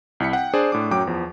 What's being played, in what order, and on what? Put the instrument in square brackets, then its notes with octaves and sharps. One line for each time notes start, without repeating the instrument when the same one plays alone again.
[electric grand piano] C2 E4 B6 C#7
F#5 G5
D4 G#4 C5 D5
A2 D4 D6
F#2 F#3 G5 D6
E2 F3